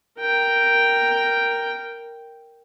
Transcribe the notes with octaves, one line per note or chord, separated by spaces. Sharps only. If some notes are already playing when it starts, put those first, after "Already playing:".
A#4 G5